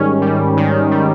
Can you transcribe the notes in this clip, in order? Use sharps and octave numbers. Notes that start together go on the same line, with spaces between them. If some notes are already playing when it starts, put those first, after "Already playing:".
Already playing: G#2 D#3 G3 C#4
G3
D#3
G3